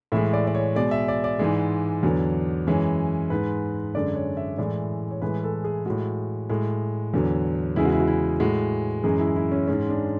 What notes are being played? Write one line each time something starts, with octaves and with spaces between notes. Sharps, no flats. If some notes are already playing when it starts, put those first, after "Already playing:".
A2 E3 G#3 E5
D5
D5
C#5
B2 G#3 D5
E5
D5
D5
G#2 E3 G#3
E2 D3 F#3
F#2 E3 G#3 C#5
G#2 G#3 B4
F#2 D3 G#3 D5
C#5
E5
A2 E3 G#3 D5
C#5
A2 E3 G#3 B4
A4
G#4
A2 G#3 F#4
A2 G#3
E2 D3 F#3
E2 C#3 G#3 E4
F#4
E4
F#4
E4
A2 G#3 F#4
F#2 E3 G#3 G#4
E4
E4
C#4
G#2 G#3 C#4
D4